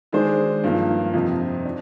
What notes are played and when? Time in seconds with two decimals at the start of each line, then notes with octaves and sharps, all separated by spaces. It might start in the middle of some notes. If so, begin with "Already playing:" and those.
0.13 D#3 G#3 D4 G#4 C5
0.64 G2 F3 A#3
1.14 F2 C3 F3 C4 D#4
1.65 D4